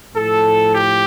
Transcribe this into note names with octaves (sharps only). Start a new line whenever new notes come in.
A2 F3 A4
G4